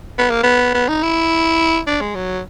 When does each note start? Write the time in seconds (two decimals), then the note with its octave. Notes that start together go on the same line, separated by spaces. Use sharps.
0.19 B3
0.30 A#3
0.44 B3
0.74 B3
0.89 D#4
1.03 E4
1.87 D4
2.01 G#3
2.15 F#3